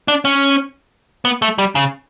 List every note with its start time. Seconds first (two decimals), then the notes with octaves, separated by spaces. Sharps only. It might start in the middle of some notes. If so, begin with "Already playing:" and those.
0.08 D4
0.25 C#4
1.25 B3
1.42 A3
1.58 G3
1.75 C#3